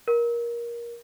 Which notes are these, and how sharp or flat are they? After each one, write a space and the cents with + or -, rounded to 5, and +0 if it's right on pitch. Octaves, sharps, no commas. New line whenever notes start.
A#4 +20